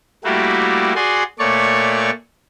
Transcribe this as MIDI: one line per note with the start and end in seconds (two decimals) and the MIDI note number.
0.24 0.93 55
0.24 0.93 57
0.24 0.93 58
0.24 0.93 64
0.24 0.93 66
0.24 0.93 67
0.95 1.23 66
0.95 1.23 68
0.95 1.23 74
0.95 1.23 80
0.95 1.23 84
1.39 2.10 46
1.39 2.10 57
1.39 2.10 73
1.39 2.10 74
1.39 2.10 85